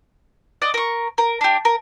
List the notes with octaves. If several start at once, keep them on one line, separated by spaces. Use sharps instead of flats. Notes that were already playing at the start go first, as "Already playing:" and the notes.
D5 D#5 F#5
A#4 C#6
A#4
D4 G4
A#4